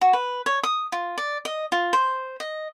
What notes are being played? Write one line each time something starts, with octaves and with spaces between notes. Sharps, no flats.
F#4
B4
C#5
D#6
F4
D5
D#5
F4
C5
D#5